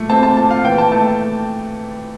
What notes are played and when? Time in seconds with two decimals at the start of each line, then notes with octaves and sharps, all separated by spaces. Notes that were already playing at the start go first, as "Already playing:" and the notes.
Already playing: A#2 A3
0.10 C4 A5
0.23 A5
0.37 A#2 A5
0.51 F5
0.64 E3 G5
0.78 A5
0.91 A3 A5